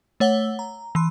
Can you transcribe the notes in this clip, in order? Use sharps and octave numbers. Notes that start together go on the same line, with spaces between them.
A3 C#5 F#5 E6 G7
A#5
E3 C6